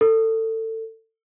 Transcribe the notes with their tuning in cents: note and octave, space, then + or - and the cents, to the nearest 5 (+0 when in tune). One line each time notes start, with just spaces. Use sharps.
A4 +25